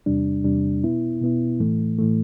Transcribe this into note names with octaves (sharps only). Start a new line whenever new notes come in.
E2 C3 G3 D4
E2 C3 G3 D4
B2 B3 E4
B2 B3 E4
A2 E3 A3
A2 E3 A3